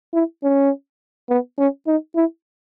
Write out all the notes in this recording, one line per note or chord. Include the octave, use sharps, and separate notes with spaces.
E4
C#4
B3
C#4
D#4
E4